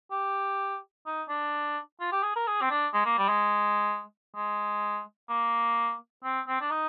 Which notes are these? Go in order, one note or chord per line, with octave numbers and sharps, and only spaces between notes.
G4
D#4
D4
F4
G4
G#4
A#4
G#4
C4
D4
G#3
A#3
G3
G#3
G#3
A#3
C4
C4
D4
D#4